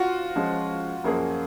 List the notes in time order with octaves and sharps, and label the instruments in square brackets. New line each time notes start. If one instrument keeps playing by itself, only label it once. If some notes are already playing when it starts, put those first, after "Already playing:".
Already playing: [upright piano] F4 F#4
[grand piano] F3 G#3 C#4
F#2 F3 A#3 C#4 G#4